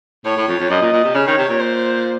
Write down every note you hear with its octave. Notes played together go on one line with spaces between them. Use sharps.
A2 C#5
A2
F2
F2
F#2 D#5
A#2
A#2
C3
C#3 C#5
D#3
C3
A#2
C5